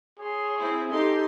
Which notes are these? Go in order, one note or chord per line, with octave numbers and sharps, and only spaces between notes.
G#4 C#5 C6
C4 E4
D#4 G4 A4 C6